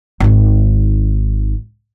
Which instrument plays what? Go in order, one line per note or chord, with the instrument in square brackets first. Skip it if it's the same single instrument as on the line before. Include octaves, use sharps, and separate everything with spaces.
[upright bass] G#1 D#3